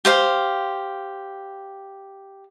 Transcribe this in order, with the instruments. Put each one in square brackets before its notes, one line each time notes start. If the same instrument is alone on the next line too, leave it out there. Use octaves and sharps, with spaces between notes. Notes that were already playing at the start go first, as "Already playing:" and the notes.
[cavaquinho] G4 C5 F5